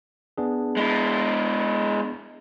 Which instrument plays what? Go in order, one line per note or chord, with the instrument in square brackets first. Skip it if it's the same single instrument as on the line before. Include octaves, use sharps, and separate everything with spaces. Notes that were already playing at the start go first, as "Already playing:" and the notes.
[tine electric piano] B3 D4 G#4
[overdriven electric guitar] G#3 E4